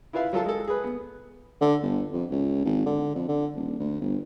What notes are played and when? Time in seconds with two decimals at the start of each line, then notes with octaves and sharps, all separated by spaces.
0.13 E4 F4 B4 E5 F5
0.33 F#3 F4 A4 A5
0.44 G#3 A4
0.67 G#4 B4
0.84 B3
1.61 D3
1.83 G1
2.13 F2
2.31 C#2
2.65 G#1
2.86 D3
3.15 F2
3.28 D3
3.55 D#1
3.79 D2
4.01 G1